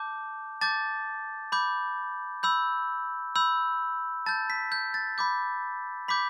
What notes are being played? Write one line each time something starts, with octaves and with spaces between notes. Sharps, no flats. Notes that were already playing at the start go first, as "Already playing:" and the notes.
Already playing: A5 D6 G6
A5 D6 G6 A6
B5 D6 G6
B5 E6 G6
B5 E6 G6
A5 G6 A6
B6
G6
A6
B5 D6 G6
B5 D6 G6 B6